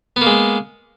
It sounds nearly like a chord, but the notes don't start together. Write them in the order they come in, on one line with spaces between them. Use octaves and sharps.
B3 A#3 G#3